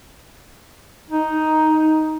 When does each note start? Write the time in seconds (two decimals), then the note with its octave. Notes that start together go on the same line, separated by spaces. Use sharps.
1.10 D#4